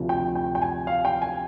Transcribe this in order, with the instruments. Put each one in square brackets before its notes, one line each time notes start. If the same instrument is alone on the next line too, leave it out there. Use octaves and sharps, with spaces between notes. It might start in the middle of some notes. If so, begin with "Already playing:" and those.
Already playing: [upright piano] D2 C3 F3
G5
G5
G5
G#5
F5
G5
G#5